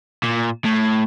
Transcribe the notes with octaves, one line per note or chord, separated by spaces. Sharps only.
A#2
A2